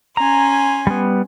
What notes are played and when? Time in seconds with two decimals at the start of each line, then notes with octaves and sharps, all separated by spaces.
0.17 C#4 G#5 A#5 C6
0.87 G3 B3